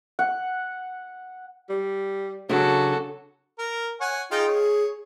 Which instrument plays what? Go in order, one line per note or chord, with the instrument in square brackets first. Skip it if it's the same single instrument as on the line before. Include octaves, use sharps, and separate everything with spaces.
[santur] F#5
[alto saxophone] G3
[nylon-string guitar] C#3 D4 [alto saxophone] F#3 [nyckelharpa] F#4 A4
[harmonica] A#4
C#5 F#5 G#5
[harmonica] D#4 F4 G5 [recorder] G#4
[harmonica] C#5